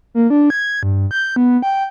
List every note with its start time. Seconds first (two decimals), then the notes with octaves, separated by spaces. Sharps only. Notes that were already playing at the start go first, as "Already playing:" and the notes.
0.15 A#3
0.30 D4
0.50 G#6
0.83 G2
1.11 G6
1.36 B3
1.62 G5